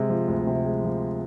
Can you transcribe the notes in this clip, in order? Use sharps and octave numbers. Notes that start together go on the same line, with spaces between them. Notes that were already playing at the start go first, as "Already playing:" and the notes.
Already playing: C3 G#3
F3
D2
C3
G#3
F3